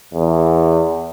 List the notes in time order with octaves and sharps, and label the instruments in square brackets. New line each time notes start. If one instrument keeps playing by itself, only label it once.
[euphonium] E2